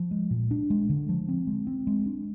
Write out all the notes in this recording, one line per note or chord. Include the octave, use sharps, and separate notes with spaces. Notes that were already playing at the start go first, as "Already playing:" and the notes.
Already playing: F3
G#3
A#2
D4
G#3
D3
F3
C4
G#3
C4
G#3
D4